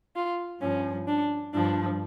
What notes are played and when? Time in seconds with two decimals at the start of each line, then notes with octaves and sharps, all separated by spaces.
0.15 F4
0.60 G2 F3 C#4
1.07 D4
1.53 G2 F3 D4